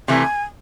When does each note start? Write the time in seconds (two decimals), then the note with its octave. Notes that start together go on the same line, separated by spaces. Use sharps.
0.08 C3 E3 A3 G#5